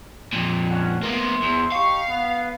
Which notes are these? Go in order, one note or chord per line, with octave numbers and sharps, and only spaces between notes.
F2 A#2
C#4 F#5
A#3 B3 C5 E5 C6
E2
D#4 G4 F5 C#6
B3